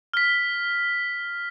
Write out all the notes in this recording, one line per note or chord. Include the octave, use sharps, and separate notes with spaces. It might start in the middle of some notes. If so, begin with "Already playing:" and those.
F6 B6